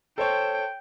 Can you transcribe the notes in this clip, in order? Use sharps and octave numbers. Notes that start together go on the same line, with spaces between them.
A4 C5 C#5 G5